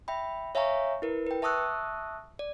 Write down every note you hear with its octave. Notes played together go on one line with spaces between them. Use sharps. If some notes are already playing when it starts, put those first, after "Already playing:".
E5 G5 B5
C#5 E5 F5 G#5 A#5 C#6
E4 A#4 B4
B4 G5
E5 A5 C#6 D#6 E6 F#6
D5